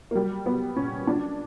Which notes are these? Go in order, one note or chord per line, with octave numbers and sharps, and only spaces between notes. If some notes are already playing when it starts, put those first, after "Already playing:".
A#3
F#3 G3
F#3 B3
A#2 C#4
F#3 D4